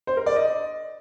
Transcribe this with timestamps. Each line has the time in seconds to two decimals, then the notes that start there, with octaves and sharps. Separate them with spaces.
0.07 C5
0.17 A#4
0.26 D5
0.36 D#5